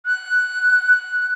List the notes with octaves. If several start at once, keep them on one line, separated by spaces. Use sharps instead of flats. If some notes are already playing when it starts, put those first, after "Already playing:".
F#6